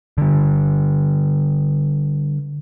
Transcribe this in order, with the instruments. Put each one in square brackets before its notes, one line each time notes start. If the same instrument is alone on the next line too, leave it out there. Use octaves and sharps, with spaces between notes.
[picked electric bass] D3 G3